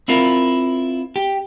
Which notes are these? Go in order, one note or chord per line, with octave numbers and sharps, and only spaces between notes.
C4 E4 F4 A#4
G4